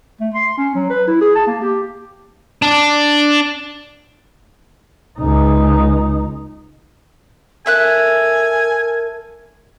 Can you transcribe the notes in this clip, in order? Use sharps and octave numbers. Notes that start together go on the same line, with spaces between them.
A3
C6
C#4
F#3
B4
E4
G#4
A5
A#3
G4
D4
C#2 D#4
A4 A#4 E5 G#5 F#6